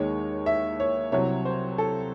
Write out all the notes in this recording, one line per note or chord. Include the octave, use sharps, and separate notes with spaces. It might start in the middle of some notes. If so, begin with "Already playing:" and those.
Already playing: D#2 D#3 G#3 C#5
E5
C#5
C2 C3 F#3 C#5
C5
A4